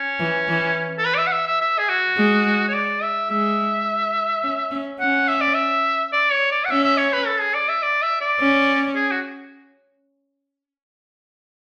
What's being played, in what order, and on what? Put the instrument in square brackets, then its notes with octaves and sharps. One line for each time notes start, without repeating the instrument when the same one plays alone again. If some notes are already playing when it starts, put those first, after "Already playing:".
Already playing: [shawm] C#4
[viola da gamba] E3
E3
[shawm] A4
B4
D5
E5
F#5
E5
E5
E5
G#4
F#4
[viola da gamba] G#3
[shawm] C#5
D5
E5
[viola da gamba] G#3 [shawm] E5
[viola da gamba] C#4
C#4
[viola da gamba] C#4 [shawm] F#5
[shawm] E5
D5
E5
D5
C#5
D5
F#5
[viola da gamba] C#4 [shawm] E5
[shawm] E5
C#5
B4
A4
G#4
D5
E5
D5
E5
D5
[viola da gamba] C#4
[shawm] G#4
F#4